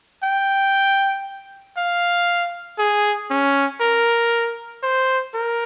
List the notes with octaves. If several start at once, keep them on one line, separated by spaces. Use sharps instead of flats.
G5
F5
G#4
C#4
A#4
C5
A#4